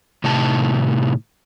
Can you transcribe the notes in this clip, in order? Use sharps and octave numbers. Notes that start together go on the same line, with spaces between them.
A2 C3 D#3 A5